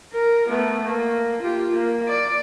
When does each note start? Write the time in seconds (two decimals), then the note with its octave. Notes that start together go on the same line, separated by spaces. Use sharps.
0.13 A#4
0.49 A3 B3
0.84 A#3
1.42 F4 G4
1.73 A#3
2.08 D5